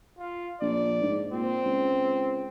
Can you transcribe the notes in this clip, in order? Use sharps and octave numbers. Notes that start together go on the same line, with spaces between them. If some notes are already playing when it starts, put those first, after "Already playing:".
F4
A#1 D5
G#2
A#2 C4
C#2